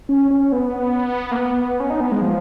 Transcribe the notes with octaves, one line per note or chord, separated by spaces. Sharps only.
C#4
C#4
B3
A#3
B3
C#4
D#4
B3
G#3
F3